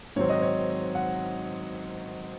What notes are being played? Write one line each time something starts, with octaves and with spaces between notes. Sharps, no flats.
G#2 D#3 F#3 C4 C#5
D#5
C#5
F#5